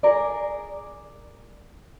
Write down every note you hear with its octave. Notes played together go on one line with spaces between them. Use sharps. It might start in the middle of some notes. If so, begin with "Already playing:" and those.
G#4 A#4 D5